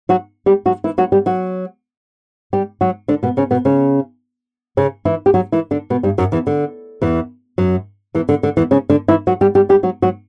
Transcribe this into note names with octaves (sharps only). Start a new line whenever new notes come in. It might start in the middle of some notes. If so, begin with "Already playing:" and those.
F#3 F#4
G3 G4
F#3 F#4
E3 E4
F#3 F#4
G3 G4
F#3 F#4
G3 G4
F#3 F#4
D3 D4
B2 B3
C#3 C#4
B2 B3
C#3 C#4
C#3 C#4
E3 E4
G4
F#3 F#4
E3 E4
D3 D4
B2 B3
G2 G3
F#2 F#3
E2 E3
D3
E2 E3
F#2 F#3
E2 E3
D3
D3
E2 E3
C#3 C#4
D3 D4
E3 E4
F#3 F#4
G3 G4
G3 G4
G3 G4
F#3 F#4
F#3 F#4